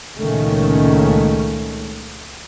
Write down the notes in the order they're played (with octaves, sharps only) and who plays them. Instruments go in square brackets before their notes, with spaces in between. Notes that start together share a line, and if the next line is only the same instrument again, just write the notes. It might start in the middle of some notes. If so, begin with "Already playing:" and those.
[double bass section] C#2 A#2 D#3 G#3 A3 C#4